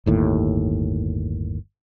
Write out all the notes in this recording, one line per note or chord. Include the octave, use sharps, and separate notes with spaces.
G1 D#2 A2